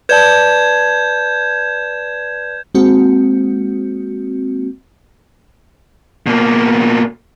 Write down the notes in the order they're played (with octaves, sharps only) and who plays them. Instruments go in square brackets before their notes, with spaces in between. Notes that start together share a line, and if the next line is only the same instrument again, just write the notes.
[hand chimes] B4 D5 A5 [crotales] G6 G#6 E7
[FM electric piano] G#3 A#3 C4 F#4
[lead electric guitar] B2 A#3